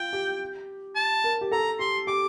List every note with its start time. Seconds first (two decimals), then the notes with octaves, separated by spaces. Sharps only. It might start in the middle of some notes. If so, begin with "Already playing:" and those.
Already playing: F4 G5
0.13 G4
0.96 A5
1.24 A#4
1.41 G4
1.52 A4 A#5
1.79 G4 C6
2.07 G4 D6